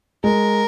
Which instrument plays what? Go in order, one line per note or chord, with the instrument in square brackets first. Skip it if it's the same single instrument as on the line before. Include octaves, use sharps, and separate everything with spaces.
[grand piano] G#3 [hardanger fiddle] A#4